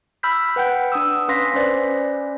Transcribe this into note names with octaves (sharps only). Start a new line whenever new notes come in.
B5 E6 F6 G6 B6
B4 F#5 G5 G6
D4 D#6 E6
C#4 B4 F5 C6 A#6 B6
C#4 B4 C5 D5